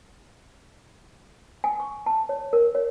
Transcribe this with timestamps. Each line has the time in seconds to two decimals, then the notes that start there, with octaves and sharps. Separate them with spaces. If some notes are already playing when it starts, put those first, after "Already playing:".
1.64 G#5
1.80 C#6
2.06 A5
2.29 C#5
2.53 A#4
2.75 C#5